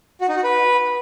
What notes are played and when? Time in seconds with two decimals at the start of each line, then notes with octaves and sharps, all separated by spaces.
0.21 F#4
0.29 D#4
0.36 F#4
0.44 B4